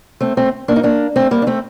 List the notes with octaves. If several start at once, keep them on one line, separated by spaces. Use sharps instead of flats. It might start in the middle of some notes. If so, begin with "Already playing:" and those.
A3 C4
A3 C4
A#3 D4
D#4
A#3 D4
A3 C4
G3 A#3
D4
A3 C4